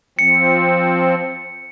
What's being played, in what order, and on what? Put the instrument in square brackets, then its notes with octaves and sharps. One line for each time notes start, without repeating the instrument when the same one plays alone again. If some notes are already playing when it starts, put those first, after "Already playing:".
[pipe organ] F3 C4 [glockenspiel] C#7